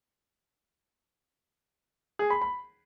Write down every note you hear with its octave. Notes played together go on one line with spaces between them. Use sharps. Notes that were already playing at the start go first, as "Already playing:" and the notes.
G#4
B5
B5